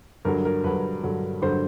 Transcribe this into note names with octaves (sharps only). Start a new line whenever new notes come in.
G2 D3 F#3 A#4
A#4
G2 D3 F#3 B4
G2 D3 F#3
G2 D3 F#3 C5